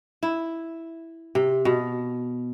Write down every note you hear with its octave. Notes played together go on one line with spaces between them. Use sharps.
E4
C3
B2